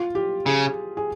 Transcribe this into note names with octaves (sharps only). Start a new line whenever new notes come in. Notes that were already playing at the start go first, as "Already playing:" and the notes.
Already playing: F4
G4
C#3 G#4
G#4